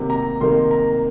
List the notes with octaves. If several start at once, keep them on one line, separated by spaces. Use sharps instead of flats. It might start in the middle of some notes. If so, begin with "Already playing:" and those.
Already playing: C3 D#3 F#3 A#3
A#5
C3 D#3 F#3 A#3 C6
A#5